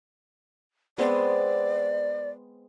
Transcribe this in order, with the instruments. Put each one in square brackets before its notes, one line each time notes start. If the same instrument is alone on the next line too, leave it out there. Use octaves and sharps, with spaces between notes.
[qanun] G#3 B3 C4 [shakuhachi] D5